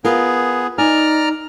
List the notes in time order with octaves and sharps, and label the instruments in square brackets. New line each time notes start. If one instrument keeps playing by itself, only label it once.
[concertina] B3 G#4 [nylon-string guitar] F4 A#4
[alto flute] D#4 [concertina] D5 A#5 F6 [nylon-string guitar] G#5